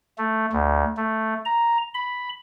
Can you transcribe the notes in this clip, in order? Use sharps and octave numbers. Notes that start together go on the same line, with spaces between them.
A3
D2
A3
A#5
B5